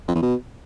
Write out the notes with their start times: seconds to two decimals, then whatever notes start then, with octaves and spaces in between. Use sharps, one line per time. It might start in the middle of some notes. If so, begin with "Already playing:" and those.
0.08 F2
0.15 E2
0.23 B2